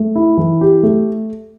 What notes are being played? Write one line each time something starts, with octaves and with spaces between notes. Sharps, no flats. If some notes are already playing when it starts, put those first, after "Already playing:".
Already playing: A3
E4
E3
G4
A3